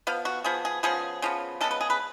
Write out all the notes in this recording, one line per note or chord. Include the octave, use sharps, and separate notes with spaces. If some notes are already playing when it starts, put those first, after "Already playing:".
F3 B3 F5
F#4
F3 B3 G#4
G#4
C#3 F3 B3 G#4
C#3 F3 B3
C#3 G#3 B3 A4
B4
G#4
B4